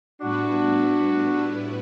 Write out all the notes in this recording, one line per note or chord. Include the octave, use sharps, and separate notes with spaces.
A2 G3 B3 D4 E4 F#4 B4